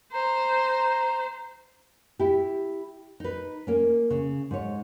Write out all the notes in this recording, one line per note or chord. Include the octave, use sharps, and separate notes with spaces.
C5 A#5
E4 G4
D#4 B4
A#3 C#4
C#3
G#2 C#5